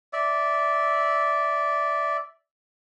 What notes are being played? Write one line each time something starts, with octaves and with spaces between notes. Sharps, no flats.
D5 E5